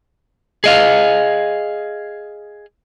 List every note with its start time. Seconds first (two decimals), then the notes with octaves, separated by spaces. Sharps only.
0.64 G#4 D#5 F5